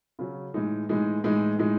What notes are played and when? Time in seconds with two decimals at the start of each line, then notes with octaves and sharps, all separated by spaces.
0.19 C#3 F#3 C#4
0.54 A2 E3 G#3 D#4
0.89 A2 E3 G#3 D#4
1.24 A2 E3 G#3 D#4
1.58 A2 E3 G#3 D#4